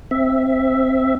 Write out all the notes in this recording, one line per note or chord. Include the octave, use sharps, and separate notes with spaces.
C4 E5